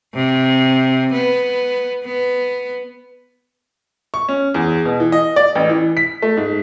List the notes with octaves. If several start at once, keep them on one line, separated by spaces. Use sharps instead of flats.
C3
B3
B3
C#6
C#4
E2
B2
E3
D#5
D5
A1
E3
B6
A3
G#2